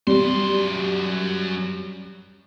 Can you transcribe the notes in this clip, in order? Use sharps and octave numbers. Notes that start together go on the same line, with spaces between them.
F#2 G3 C6